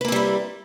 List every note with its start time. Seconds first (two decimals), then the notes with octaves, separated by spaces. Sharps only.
0.01 B4
0.05 A#3
0.08 C4
0.12 G3
0.16 E4